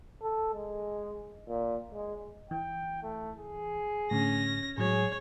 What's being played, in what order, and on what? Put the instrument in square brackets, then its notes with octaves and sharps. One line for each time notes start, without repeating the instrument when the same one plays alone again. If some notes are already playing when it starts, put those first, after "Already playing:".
[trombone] A4
G#3
A#2
G#3
[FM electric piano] E3 [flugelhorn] G5
[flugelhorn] A3
G#4
[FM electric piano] A2 D3 [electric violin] C#4 A#6
[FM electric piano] A2 F#3 G#3 [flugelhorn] G#4 [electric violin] C#5